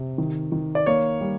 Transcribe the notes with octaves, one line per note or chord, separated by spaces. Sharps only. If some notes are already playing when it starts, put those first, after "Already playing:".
Already playing: C3
D#3
D#3
D5
A#3 C#5
G3